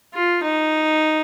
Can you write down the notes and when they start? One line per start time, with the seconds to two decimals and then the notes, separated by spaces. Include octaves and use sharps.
0.14 F4
0.43 D#4